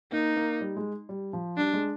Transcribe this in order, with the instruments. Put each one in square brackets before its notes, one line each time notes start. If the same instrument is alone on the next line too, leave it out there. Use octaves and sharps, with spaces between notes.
[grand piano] A#3 [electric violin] D#4
[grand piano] A#3
G3
G#3
G3
F3
[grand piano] G3 [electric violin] D4
[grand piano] G#3